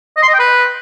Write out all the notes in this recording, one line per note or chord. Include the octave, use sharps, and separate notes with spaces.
D#5
C6
D#5
G5
B4